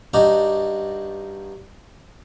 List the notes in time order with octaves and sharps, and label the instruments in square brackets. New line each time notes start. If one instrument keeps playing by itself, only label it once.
[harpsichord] G2 D4 D#4 F#4 D5